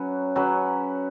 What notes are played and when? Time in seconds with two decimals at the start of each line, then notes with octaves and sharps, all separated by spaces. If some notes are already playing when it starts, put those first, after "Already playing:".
Already playing: F#3 C#4 B4
0.36 F#3 C#4 B4